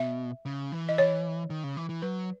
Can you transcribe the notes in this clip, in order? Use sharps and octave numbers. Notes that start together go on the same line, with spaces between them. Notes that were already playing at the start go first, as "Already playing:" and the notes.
Already playing: B2 E5
C#3
E3
D#5
C#5
D#3
C#3
E3
E3
F#3 B4